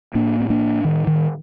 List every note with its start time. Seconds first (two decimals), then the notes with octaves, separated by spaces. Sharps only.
0.15 A2 A#3 D4
0.40 C4
0.50 A#3 D4
0.84 D#3
1.07 D#3